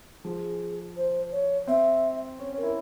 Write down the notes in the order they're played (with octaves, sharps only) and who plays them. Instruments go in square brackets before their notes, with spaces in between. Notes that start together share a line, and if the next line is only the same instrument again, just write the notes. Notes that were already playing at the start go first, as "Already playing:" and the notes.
[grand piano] F3 [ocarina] G#4
[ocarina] C5
C#5
[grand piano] C4 [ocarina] E5
[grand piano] C#4 [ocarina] C#5
[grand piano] C#4 [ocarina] A#4
[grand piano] E4